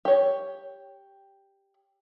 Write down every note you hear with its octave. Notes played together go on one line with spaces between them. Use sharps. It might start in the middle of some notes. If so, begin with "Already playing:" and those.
G4 C#5